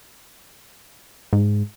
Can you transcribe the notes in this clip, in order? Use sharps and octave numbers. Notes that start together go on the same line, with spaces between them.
G#2